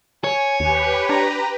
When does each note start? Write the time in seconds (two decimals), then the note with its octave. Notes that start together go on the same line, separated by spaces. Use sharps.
0.24 C#5 G#5
0.60 D#2 G4 B4
1.09 D4 A#5